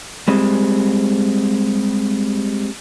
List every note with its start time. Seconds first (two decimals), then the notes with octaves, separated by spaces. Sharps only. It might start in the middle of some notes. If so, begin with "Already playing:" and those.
0.28 G3 G#3 C4